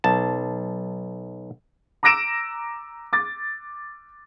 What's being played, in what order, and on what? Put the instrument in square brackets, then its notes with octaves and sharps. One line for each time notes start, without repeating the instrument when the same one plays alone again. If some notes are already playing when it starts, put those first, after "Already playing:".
[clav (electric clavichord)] B1 A5
[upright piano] A#5 D6 E6 A#6 D7 E7
D6 A6